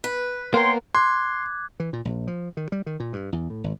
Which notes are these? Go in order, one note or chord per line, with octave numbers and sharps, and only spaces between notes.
B4
A#3 B3 A#4 C#5 G5 C6
C6 D6 F#6 G#6
E3
A#2
A#1
F3
D#3
G3
D#3
A#2
G2
E2
A2
G#1